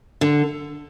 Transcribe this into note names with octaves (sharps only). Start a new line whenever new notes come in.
D3